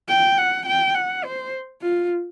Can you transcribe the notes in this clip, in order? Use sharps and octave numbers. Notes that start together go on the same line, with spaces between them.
G5
F#5
G5
F#5
C5
F4